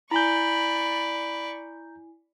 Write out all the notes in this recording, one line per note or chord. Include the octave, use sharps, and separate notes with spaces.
E4 D5 G#5 A#5 B5 C#6 G6